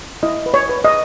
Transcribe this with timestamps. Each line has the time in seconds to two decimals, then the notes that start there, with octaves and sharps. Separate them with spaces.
0.23 E4 D#5
0.46 B4
0.54 C#5
0.69 B4
0.85 D#5